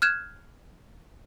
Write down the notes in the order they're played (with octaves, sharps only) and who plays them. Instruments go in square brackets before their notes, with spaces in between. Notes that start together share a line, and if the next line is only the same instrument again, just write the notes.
[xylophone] F6 F#6 G#6 E7